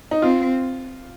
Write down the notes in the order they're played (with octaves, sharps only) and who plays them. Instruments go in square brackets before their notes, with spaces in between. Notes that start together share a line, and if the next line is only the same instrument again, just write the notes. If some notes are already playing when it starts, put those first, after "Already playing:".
[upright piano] D#4
[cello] C4 [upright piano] F4